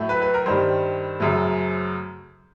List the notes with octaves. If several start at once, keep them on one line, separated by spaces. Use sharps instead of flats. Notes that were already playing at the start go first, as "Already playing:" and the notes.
Already playing: A2 F#3 A3
B4
B4
A#4
G2 D#3 G3 C5
F#2 C#3 F#3 A3